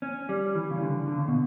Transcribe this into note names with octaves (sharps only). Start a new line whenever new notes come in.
C#4
G3
E3
C#3
D3
D3
C#3
B2